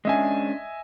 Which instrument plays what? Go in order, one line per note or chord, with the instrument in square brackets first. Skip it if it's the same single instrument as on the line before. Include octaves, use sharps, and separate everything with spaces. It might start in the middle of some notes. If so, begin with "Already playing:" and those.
[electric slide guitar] G#3 C#4 D4 [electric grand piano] D#5 E5 G#5